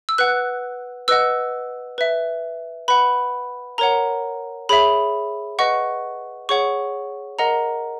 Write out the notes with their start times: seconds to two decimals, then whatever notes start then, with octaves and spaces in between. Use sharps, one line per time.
0.09 E6
0.18 B4 F#5 F#6
1.08 B4 D#5 F#5 E6
1.98 B4 E5
2.88 B4 F#5 B5
3.78 A#4 C#5 F#5 A#5
4.69 G#4 C#5 E5 B5
5.59 B4 D#5 F#5 C#6
6.49 G#4 C#5 F#5 C#6
7.39 A#4 D#5 F#5 A#5